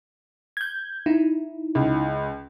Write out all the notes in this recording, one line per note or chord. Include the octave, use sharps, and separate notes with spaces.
G6 G#6
D#4 E4
C#2